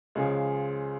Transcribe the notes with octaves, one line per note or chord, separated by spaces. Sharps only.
C#2 C#3 F3 G#3